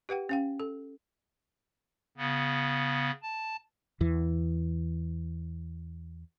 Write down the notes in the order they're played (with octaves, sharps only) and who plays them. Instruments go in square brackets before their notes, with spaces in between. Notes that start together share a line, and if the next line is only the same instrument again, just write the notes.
[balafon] G4 B4 F#5 G5
C#4 F5 G5
A4
[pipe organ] C#3 B3
A5
[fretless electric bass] E2 E3